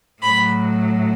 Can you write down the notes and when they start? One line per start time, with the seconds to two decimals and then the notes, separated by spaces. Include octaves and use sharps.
0.22 A2 F#3 B5